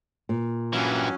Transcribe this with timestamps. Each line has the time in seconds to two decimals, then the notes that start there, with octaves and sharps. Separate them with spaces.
0.29 A#2
0.73 G2 E3 F#3 C#4